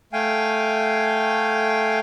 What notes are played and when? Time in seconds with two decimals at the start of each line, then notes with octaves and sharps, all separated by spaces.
0.13 A3 F5 G5 G#5